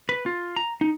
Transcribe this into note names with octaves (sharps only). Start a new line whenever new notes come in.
B4
F4
A#5
D#4